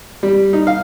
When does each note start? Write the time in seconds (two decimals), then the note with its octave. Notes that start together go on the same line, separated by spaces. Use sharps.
0.23 G3
0.53 D#4
0.67 F5